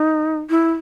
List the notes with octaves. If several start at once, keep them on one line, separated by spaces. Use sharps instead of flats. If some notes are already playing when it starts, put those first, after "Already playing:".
Already playing: D#4
E4